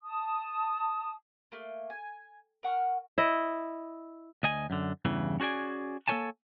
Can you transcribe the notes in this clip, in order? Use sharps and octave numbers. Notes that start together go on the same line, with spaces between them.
A5 D#6
A3 A#3
G#5
A#4 F#5 C#6 F6
E4 D#5
D2 D#5 G#5
F#2 D3
E2 G2 C#3 E3
C#4 F#4 G#4 D5 G#5
A#3 A4 B4 C#5 G#5 A5